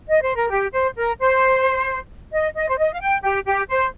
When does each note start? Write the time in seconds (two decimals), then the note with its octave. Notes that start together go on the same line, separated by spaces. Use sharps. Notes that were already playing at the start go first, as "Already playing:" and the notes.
0.09 D#5
0.22 C5
0.36 A#4
0.50 G4
0.72 C5
0.96 A#4
1.19 C5
2.32 D#5
2.55 D#5
2.69 C5
2.78 D#5
2.93 F5
3.01 G5
3.23 G4
3.46 G4
3.70 C5